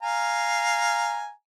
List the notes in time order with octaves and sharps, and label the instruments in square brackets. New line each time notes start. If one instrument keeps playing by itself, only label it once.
[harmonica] F5 G#5 A#5